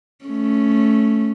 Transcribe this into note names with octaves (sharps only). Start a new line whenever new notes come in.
A3 C#4